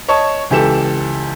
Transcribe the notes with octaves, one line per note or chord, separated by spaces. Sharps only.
C#5 D#5 A5 C#6
C#2 E3 G4 A4 E7